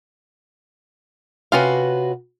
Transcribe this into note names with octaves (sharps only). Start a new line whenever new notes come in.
C3 C#4 F4 F#4 B4 F5